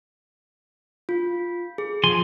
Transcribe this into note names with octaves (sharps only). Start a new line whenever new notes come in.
F4
G#4
F3 G#5 C6